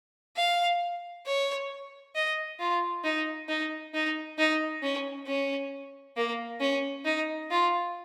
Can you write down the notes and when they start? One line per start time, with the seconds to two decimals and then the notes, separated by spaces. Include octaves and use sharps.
0.37 F5
1.26 C#5
2.15 D#5
2.59 F4
3.04 D#4
3.48 D#4
3.94 D#4
4.38 D#4
4.82 C#4
5.27 C#4
6.17 A#3
6.60 C#4
7.05 D#4
7.50 F4